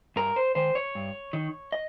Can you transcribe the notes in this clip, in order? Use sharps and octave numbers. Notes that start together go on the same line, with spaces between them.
G2 A#4
C5
D#3 C5
C#5
G2
D#3
D#5